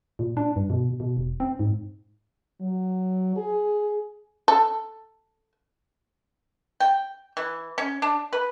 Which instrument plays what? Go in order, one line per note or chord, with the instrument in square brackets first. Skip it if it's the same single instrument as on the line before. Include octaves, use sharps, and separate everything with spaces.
[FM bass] A#2
D4
G2
B2
B2
E1
C4
G#2
[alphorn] F#3
G#4
[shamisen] A4
[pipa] G5
E3
C#4
D4
B4